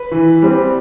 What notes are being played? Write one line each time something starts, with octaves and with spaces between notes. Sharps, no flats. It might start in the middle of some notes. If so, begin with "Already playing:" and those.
Already playing: B4
E3
G3 C4